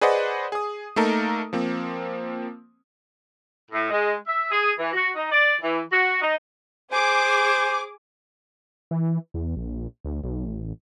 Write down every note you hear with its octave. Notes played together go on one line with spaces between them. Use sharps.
G#4 B4 C5 D5 D#5 F#5
G#4 D#6
A3 A#3 D#4 A4 A#4
F3 A#3 C4
A2
G#3
E5
G#4
E3
F#4
D#4
D5
E3
F#4
D#4
G#4 C5 G#5 D6
E3
E2
A#1
D2
B1
A1